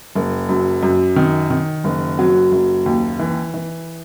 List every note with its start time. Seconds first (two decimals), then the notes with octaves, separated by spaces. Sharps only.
0.15 F#1
0.49 F#2
0.83 F#2
1.16 D#3
1.50 D#3
1.84 F#1
2.19 F#3
2.52 F#1
2.86 D#2
3.19 E3
3.54 E3